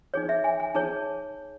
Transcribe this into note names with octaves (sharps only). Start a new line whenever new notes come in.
D#4 G#4 C#5
E5
G#5
G#5
D#4 G#4 C#5 A5